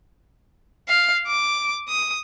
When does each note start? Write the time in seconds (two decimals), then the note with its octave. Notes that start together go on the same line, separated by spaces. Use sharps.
0.88 F5
1.27 D6
1.89 D#6